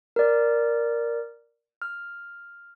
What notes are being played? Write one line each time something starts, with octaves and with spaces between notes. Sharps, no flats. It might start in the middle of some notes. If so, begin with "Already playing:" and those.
A#4 D5
F6